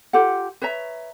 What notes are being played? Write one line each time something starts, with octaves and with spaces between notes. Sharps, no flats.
F4 G4 A4 F#5
B4 C#5 E5 A#5